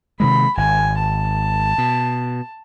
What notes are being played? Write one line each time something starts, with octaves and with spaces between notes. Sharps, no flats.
C3 D#3 G#3 B5
G#1 G#5
A5
B2